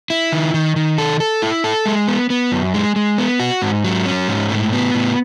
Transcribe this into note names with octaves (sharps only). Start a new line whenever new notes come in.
E4
D#3
D#3
D#3
A4
A4
E4
A4
G#3
B3
B3
F#2
G#3
G#3
B3
F#4
G#2
F#3
C#4
G#2
A2
B3
A2